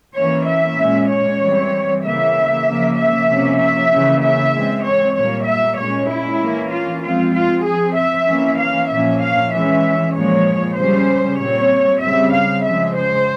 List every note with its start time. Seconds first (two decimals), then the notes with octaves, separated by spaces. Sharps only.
0.16 E3 A#3 C#4 C#5
0.47 E5
0.79 A#2 G#3 C#4
1.10 C#5
1.41 E3 G3 C4
2.03 C#3 E3 A#3 E5
2.66 C#3 F3 A#3
2.97 E5
3.29 C3 F3 A#3 C#4
3.60 E5
3.91 C#3 E3 A#3 C#4
4.22 E5
4.53 E3 G#3 C4
4.84 C#5
5.16 A#2 G3 A#3 C#5
5.47 E5
5.78 A#2 G#3 C#4 C#5
6.09 E4
6.40 E3 A#3 C#4
6.72 F4
7.03 F3 G#3 C4 F4
7.34 F4
7.65 F3 C4 G#4
7.97 E5
8.28 E3 A#3 C#4
8.59 F5
8.90 A#2 F3 A#3 C#4 E5
9.22 F5
9.52 E3 G#3 C#4 E5
10.15 A#2 F3 G#3 C#5
10.77 C#3 G3 C#4 C5
11.40 A#2 G3 C4 C#5
12.02 C#3 G3 C4 E5
12.34 F5
12.64 C#3 F3 G#3 E5
12.96 C5